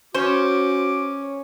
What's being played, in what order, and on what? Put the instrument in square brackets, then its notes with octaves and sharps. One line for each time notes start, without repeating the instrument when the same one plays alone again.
[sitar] C#4 [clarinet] F#4 [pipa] C5 [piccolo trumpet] D6